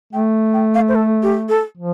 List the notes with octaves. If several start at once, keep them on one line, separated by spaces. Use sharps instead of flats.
A3 G5
G5
F5
C5
A4
G4
A4
F3